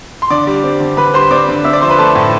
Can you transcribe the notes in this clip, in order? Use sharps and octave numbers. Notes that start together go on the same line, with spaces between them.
C6
D3 D5 D6
G3
C4
D3
D3 B4 B5
G3 C5 C6
C4 D5 D6
D3
C4 E5 E6
D5 D6
F3 C5 C6
B4 B5
A3 A4 A5
A2